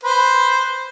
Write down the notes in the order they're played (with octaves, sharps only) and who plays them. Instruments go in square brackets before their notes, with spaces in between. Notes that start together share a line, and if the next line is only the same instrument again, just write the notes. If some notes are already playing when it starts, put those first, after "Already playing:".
[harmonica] B4 C5